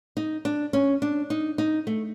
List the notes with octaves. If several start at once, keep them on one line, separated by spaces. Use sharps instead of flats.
D#4
D4
C#4
D4
D#4
D#4
A3